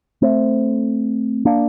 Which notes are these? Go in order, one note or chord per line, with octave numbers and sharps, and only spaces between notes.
A3 C4
A#3 D4